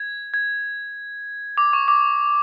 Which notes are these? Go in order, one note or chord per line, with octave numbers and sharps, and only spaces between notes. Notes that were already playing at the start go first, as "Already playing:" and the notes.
Already playing: G#6
G#6
D6
C#6
D6